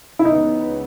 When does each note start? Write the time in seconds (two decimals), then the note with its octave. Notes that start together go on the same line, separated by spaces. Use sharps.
0.19 E4
0.25 C#2 C#3 E3 B3 D#4